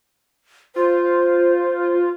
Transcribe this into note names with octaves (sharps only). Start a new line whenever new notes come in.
F4 C5